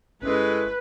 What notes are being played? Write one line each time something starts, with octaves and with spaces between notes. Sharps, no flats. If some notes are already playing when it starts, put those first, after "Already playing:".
G1 G#3 A3 C#4 E4 B4